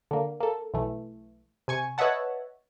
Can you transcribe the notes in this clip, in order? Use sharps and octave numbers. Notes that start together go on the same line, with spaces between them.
D3 A#3
A#3 A4
B1 E3 A3
C3 G#5 C#6
B4 C#5 D#5 E5 F#5 A5